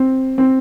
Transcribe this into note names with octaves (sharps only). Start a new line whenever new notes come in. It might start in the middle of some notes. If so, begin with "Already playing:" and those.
Already playing: C4
C4